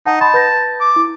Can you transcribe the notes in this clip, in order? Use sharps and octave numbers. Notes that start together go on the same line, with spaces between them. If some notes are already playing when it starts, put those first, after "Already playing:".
D#4 F#5 A5
D#5 A5 B5 C6
B4 G6 A#6
D6
E4